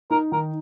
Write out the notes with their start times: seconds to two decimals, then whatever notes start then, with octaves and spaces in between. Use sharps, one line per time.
0.11 D#4 A#4
0.32 D#3 A#4